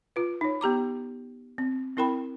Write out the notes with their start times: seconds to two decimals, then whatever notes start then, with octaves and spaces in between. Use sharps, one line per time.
0.16 F4 B4
0.41 D#4 C#5
0.61 B3 G4 A#5 D6
1.58 C4
1.97 C4 E4 A#4 G5 B5